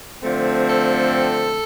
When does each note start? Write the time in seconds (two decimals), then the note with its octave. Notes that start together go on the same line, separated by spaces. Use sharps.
0.23 D3 F3 A3 C4
0.67 A4